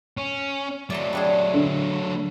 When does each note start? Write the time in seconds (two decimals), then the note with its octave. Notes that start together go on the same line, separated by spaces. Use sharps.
0.17 C#4
0.90 F#3 A3 D5 A5 C6
1.13 G3 D4 G#4
1.54 D3